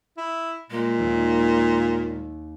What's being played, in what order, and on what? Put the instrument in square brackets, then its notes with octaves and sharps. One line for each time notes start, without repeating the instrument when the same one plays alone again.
[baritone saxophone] E4
[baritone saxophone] A#2 [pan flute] G#3
[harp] D#2